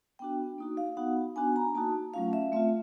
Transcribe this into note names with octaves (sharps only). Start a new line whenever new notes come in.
B3 D4 F#4 G5
A#3 D#4 F#4
F5
B3 D#4 F#4 F#5
B3 D4 F#4 G#5
A#5
A#3 D#4 F#4 A5
F#3 A3 C#4 F4 F5
E5
A3 C4 F4 E5